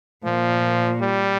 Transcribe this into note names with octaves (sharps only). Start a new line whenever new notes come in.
A#2 F3
G3